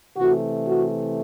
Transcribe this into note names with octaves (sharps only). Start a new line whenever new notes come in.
C3 E3 A3 F#4
F#4